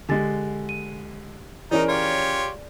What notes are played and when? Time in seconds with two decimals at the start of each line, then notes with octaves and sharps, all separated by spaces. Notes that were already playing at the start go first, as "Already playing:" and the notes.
0.09 D3 G#3 G4 G#5 A6
0.69 D#7
1.71 E3 C#4 D#4 G#4 A#4 D5
1.89 F4 G4 C#5